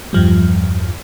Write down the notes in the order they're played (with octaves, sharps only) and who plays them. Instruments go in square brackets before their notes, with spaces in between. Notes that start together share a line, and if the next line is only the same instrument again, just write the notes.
[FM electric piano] E2 G2 F3 G3